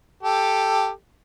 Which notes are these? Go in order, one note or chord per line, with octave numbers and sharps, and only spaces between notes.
G4 A4